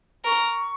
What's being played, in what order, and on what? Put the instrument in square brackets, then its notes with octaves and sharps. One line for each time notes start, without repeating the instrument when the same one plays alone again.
[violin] A#4 [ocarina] C#6